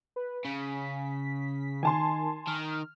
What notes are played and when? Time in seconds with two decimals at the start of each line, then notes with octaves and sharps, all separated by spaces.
0.16 B4
0.45 C#3 B6
1.83 D#3 G#5 A5 C6
2.48 D#3 F6